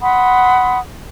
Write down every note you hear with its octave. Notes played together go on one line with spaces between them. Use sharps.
F#5 B5 C6 D#6